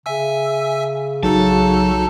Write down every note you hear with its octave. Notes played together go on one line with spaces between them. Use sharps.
C#3 E5 G#5 E6
B1 F#3 D#4 A4 A5